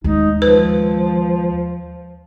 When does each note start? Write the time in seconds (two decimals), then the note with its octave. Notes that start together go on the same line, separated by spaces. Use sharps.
0.04 D#2 G#3 D#4
0.42 F3 B4